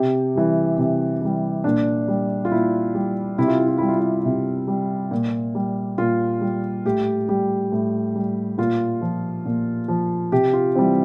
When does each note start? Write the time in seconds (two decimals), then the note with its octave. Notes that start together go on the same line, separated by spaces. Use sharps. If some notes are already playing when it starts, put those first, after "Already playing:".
Already playing: C3 G4
0.35 E3 G3
0.78 C3
1.21 E3 G3
1.64 A#2 D4
2.08 G3
2.45 F4
2.51 A#2 E4
2.95 G3
3.38 C3 E4
3.48 F4
3.58 E4
3.68 F4
3.78 G3 E4
3.88 F4
3.98 E4
4.25 C3
4.68 G3
5.11 A#2
5.55 G3
5.98 A#2 F4
6.41 G3
6.85 A2 G4
7.28 G3 G4
7.72 A2
8.15 G3
8.58 A#2 F4
9.02 F3
9.46 A#2
9.88 F3
10.32 C3 G4
10.53 F4
10.75 E3 G3 C4